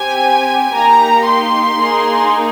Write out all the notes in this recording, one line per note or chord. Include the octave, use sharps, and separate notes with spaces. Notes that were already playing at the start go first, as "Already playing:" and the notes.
Already playing: C4 G4 G#5
A#3 D#4 G4 A#5
C6
A#3 D#4 G#4